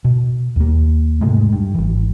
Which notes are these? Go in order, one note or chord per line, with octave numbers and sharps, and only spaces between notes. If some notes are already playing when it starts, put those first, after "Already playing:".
B2
D#2 A#3
G#2 C3 G#3 A3
G2
G#1 E3